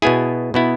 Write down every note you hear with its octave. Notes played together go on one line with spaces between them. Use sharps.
B2 B3 E4 G#4 G#5
B2 B3 E4